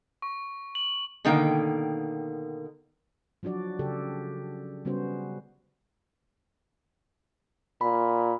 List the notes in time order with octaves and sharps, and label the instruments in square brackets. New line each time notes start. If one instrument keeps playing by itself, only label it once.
[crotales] C#6
F#7
[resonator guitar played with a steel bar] B2 D3 D#3 A#3 G5
[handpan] F3 F#3 D4 F#4 D5
C#3 G4 A4
C#3 G3 B3 C#4 F#4 C5
[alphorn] A#2 [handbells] B5